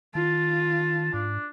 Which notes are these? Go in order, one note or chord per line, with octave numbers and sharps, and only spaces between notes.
D#3 F4 A5
G#2 D4